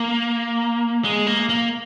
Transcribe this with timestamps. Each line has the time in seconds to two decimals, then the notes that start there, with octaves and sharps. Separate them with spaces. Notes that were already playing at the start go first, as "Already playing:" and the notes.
Already playing: A#3
1.04 G#3
1.27 A#3
1.49 A#3